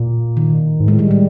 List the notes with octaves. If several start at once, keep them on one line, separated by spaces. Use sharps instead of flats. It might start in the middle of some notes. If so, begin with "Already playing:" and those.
Already playing: A#2
D#3
G#2
A2 G#3
G3
G#3